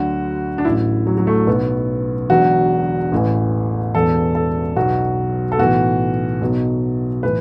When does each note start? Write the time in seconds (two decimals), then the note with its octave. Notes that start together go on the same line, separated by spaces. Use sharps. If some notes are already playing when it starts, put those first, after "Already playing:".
Already playing: D2 D3 F#3 F#4
0.58 D4
0.65 A1 A2 F#3 E4
1.07 F#3
1.18 F#3
1.27 A3
1.47 B1 B2 F#3 B3
2.30 E1 E2 D3 F#3 F#4
3.12 A1 A2 E3
3.94 E1 E2 E3 A4
4.35 A4
4.76 B1 B2 F#3 F#4
5.52 A4
5.58 B1 A2 E3 F#4
6.41 B1 B2 F#3
7.23 A2 E3 B4